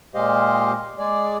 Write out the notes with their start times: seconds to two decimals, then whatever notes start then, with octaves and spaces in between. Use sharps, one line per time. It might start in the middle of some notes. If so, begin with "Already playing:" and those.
0.15 A#2 G#3 G4 C5 D#5 F5
0.99 G#3 G#4 D5